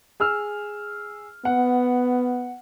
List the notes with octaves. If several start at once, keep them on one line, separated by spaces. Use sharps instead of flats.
G#4 E6 F6
B3 F#5